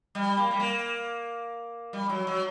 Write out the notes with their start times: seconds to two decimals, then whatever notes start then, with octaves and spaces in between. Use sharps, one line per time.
0.15 G3
0.37 A#3
0.51 G3
0.60 A#3
1.93 G3
2.09 F#3
2.27 F#3